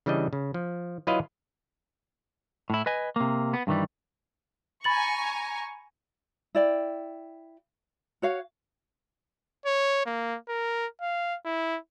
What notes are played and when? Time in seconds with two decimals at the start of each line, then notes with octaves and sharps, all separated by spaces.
0.06 C#3 E3 G3 D4 D#5
0.33 C#3
0.54 F3
1.07 F#3 E4 F4 B4 D#5 F5
2.70 A2 E4
2.86 B4 D#5 G#5
3.16 C3 A#3
3.54 B3
3.67 G2 D#3 E3 G3
4.84 G#5 A#5 B5 C#6 A6 F#7
6.55 E4 D5 G5
8.22 F#4 C#5 F5
9.66 C#5
10.06 A#3
10.49 A#4
11.01 F5
11.45 E4